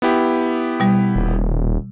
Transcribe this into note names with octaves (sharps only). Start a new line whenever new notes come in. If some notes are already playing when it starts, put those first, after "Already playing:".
B3 E4 G4
B2 G3
D#1